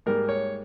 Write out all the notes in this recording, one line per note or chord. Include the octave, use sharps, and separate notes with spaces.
G#2 G3 A#3 A#4
C#5